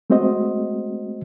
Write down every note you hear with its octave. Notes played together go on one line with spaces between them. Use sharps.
G#3 A3 C4 F#4 C5 D#5